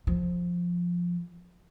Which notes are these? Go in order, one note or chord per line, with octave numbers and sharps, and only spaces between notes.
F3